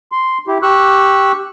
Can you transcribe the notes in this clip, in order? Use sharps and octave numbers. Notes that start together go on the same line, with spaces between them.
C6
E4 G4
G4 C#6 E6 F#6